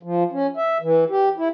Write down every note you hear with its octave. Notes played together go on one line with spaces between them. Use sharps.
F3
C#4
E5
E3
G4
E4